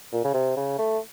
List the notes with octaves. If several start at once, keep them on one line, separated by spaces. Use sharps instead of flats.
A#2
C#3
C3
C#3
A3